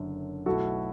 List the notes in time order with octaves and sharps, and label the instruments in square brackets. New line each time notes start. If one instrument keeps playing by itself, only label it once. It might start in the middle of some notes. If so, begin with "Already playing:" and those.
Already playing: [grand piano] F#1 F#2 D3
[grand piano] B1 B2 A3 E4 [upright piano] F#4 A4